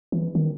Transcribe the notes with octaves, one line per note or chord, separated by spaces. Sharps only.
E3
D#3